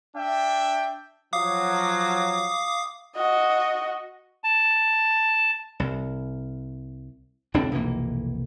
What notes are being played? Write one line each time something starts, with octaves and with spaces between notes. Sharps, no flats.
D4 E5 G5
F3 F#3 F5 D6 D#6
F#4 D#5
A5
C2
D#1 C#2 C4 D4
F1 B1 E3 A#3